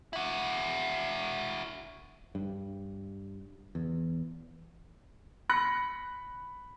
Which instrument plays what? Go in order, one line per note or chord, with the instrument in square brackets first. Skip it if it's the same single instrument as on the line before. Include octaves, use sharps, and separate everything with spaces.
[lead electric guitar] E4 F#4
[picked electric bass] G2
E2
[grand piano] B5 F#6 A#6 C#7